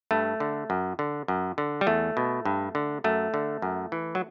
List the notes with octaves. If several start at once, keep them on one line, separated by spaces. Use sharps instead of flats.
G2 A3
D3
F#2
D3
F#2
D3
G3
E2 A3
B2
G2
D3
F#2 A3
D3
F#2
E3
F#3